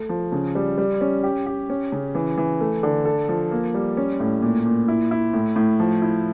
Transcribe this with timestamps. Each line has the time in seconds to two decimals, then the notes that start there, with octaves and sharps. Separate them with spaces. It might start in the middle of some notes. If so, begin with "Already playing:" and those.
Already playing: A3
0.09 F3
0.32 C#3
0.55 G3
0.78 G3
1.01 C#4
1.23 G4
1.46 G4
1.70 C#4
1.92 C#3
2.15 E3
2.38 E3
2.61 A3
2.83 D3
3.05 A4
3.28 F3
3.51 A#3
3.74 G3
3.97 C#4
4.20 A2
4.42 A#2
4.65 A#2
4.88 E4
5.11 E4
5.34 A2
5.56 A2
5.80 F3
6.02 E4